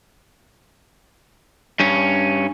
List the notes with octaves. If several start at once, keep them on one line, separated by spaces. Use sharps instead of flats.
G2 C#4